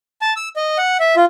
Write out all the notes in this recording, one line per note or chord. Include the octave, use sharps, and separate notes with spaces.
A5
E6
D#5
F#5
E5
F4